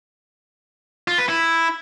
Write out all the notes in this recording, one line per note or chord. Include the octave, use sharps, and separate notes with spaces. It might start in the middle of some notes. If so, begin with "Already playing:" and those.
F4
B4
E4